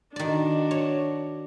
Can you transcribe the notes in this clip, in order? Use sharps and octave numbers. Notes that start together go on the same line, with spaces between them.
D#3 D4 F#4 D5
C#5